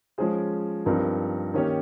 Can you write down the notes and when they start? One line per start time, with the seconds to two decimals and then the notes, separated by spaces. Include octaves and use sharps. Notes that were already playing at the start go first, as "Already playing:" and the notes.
0.18 F3 G#3 C#4 G#4 C5
0.86 G2 F3 C4 D#4 A#4
1.54 D#3 A#3 C#4 G4 C#5